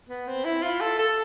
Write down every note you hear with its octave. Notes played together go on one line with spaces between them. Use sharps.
B3
C4
E4
F4
A4
A4